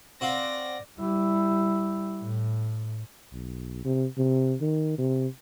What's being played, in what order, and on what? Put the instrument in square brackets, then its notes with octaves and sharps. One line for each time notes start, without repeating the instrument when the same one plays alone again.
[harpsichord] C4 F#4 F5 [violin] D5 A#6
[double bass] G3 E4
A2
[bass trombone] B1
C3
C3
D#3
C3